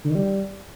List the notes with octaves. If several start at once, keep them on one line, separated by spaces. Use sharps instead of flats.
D3
D#3
G3